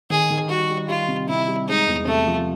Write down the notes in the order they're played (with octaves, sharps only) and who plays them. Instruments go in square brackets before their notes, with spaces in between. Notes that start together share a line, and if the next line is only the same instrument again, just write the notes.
[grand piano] D#3 [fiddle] G#4
[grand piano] D#3
[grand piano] G3 [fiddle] F#4
[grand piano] G3
[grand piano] G3 [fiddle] F4
[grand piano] C3
[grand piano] C3 [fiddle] E4
[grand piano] G3
[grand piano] G#3 [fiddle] D#4
[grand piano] E2
[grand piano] C3 [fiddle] A3
[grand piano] F3